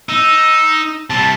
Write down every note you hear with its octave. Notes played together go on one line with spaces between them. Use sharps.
D#4 E6
C3 G3 A5